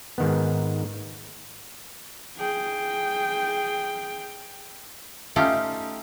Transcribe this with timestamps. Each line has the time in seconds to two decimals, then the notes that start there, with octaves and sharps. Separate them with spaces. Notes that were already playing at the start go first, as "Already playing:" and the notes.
0.18 G#2 D#3 B3
2.37 G#4 G5
5.36 A3 C#4 D#4 F4 G4